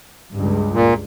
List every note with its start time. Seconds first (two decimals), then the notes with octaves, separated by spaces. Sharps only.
0.33 C#2 G2
0.73 A#2